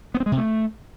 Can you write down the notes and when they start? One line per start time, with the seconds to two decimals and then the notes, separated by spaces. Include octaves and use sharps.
0.14 B3
0.20 C4
0.26 G#3
0.32 C3
0.38 A3